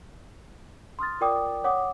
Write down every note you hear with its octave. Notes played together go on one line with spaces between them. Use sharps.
C6 D#6 F6 A6
F4 A#4 D5 G5 D6 D#6
C#5 F#5 D6 D#6